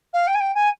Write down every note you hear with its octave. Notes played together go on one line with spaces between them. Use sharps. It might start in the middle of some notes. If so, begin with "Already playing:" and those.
F5
G5
G#5
G5
G#5